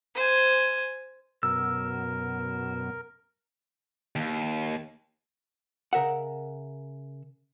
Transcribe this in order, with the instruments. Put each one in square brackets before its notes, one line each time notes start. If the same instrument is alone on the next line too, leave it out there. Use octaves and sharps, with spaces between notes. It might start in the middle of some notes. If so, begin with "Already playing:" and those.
[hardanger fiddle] C5 G#5
[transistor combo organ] F#2 B2 [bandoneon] A#4 [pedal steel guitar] E6
[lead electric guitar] D#2
[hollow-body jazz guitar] C#3 A#4 E5 F#5